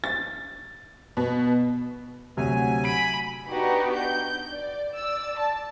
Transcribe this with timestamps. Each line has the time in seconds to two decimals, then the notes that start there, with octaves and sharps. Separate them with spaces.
0.04 A6
1.17 B2
2.37 D2 C3 F#3 G#5
2.85 B5 D7
3.49 B3 D4 D#4 F#4 G4 B4
3.95 G6
4.51 D5
4.93 D5 E6
5.38 A5